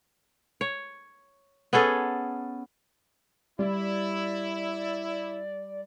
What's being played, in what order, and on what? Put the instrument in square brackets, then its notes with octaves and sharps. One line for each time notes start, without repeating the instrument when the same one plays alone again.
[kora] C#5
B3 C#4 G#4 A4
[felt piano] G3 [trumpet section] E4 [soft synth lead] D5